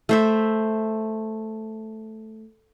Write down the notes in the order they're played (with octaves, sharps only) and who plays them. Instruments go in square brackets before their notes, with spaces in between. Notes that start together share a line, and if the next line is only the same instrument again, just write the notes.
[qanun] A3 C5 E5